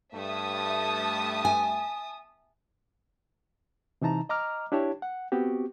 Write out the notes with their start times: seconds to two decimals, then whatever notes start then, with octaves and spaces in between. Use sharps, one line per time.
0.14 G2 A3 E5 A5 D#6
1.45 G#5
4.02 C3 E3 D#4 A5 A#5
4.29 D#5 A#5 D6 F6
4.72 D4 E4 G4 C#5 A5
5.02 F#5
5.32 B3 C4 F#4 G4